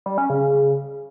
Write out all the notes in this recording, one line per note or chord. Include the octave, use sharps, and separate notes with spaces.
G3
C#4
C#3